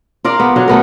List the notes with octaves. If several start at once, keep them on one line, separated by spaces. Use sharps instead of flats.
F4 A#4 D5 F5
B3
D3 F#3 F5
A3 B3 A#4